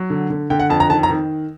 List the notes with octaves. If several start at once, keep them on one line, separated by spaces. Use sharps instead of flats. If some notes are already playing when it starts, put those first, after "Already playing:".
Already playing: F#3
D3
D3
D3 G5
F#5
F2 A5
A#5
D#3 A5
A#5
D#3